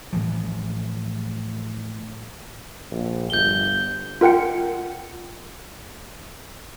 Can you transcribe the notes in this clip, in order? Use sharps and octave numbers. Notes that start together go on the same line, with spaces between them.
A2 E3 F3
A#1
G1 G6 G7
F4 A#4 F#5 G5 C#7